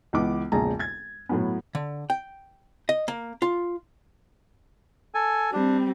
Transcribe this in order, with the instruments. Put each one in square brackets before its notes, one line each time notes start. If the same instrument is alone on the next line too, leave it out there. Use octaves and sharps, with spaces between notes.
[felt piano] C#2 E3 B3 D6
E1 A#1 C#3 G#4 A5 A#5
G#6 A6
A2 F#3 B3
[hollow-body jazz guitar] D3
G5
D#5
A#3
F4
[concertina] A4 G#5
[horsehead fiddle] G3 C4 [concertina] D4